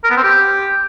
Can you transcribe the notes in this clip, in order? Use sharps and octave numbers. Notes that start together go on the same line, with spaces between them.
A#4
B3
C4
G4